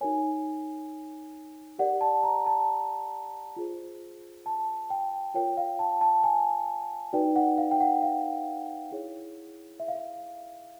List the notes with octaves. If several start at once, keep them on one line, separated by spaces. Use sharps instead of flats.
D#4 F#4 A#4 C#5 G#5
G4 A#4 D5 F#5
A5
A#5
A5
F4 G#4 C5
A5
G5
F4 A#4 C#5 G5
F5
A5
A5
G#5
D#4 F#4 B4 D5 G5
F#5
F5
G5
F#5
F5
E4 G#4 C#5
E5
F5
E5